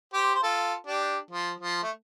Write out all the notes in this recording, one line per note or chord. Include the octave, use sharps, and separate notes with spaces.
G4 C5
C5
F4 A4
D4 G4
F3
F3
A3